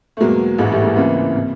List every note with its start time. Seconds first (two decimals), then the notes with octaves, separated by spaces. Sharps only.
0.17 A3
0.20 E2 B2 F#3 G#3 A#3
0.58 A1 G#2 E3 G#3
0.71 G3 A3
0.84 G#3 A#3
0.96 C#2 C#3 E3 A#3 C4
1.36 C3